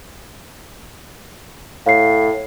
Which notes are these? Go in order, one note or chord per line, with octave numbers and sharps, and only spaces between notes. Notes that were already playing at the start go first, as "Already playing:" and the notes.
A2 F5 C7